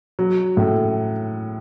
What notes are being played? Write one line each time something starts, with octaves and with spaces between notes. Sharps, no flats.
F#3
A2